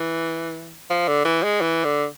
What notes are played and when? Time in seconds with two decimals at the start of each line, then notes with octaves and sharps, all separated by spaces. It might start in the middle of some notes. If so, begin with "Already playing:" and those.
Already playing: E3
0.90 F3
1.08 D3
1.25 E3
1.43 G#3
1.61 E3
1.84 D3